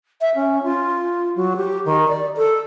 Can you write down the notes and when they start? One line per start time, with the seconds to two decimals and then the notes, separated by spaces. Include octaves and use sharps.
0.21 E5
0.35 C#4
0.63 F4
1.36 F#3
1.56 G4
1.85 D#3
2.08 D5
2.37 A4